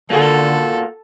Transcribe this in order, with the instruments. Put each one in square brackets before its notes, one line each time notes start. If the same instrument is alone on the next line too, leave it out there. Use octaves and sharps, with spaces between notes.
[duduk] D3 [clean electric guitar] A#3 F4 F#4 [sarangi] A4